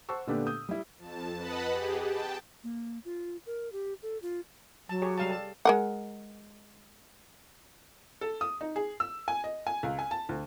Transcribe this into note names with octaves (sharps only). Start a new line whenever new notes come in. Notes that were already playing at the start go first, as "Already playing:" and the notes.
C5 F#5 A5 C#6 E6
A#2 D3 A3 B3 D4 G4
D#6 G6
G3 E4
F2 A5
B4 D#5 F#5 A5 B5
G4 G#4
G5 A5
A#3
F4
A#4
G4
A4
F4
F#3 A5
G4 G#4 C#5
G3 F5 A5
A4 A5
G#3 A#4 F#5
A4
D#6
D#4
G#4
E6
G#5
D#5
G#5
C#2
G#5
A5
D2